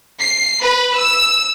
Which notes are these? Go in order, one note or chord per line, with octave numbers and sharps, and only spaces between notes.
C7
B4 B5
E6